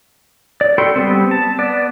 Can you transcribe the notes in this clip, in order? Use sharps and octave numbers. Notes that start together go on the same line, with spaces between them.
D5
F#4 A4 G5 B5 C6
G3 A3 B3 C4
A5
B3 D5